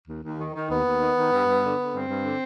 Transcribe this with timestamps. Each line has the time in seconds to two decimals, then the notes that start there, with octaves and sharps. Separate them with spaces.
0.08 D#2
0.24 D#2
0.40 D#3
0.54 D#3
0.70 D#2 B3
0.86 D#2
1.01 D#3
1.16 D#3
1.33 G2
1.47 G2
1.63 D3
1.78 D3
1.93 G2 C4
2.09 G2
2.25 D3